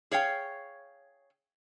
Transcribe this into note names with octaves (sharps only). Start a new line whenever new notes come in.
G#4 C#5 F5 G5